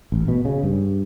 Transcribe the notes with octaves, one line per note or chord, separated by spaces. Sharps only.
A1
B2
C#3
G2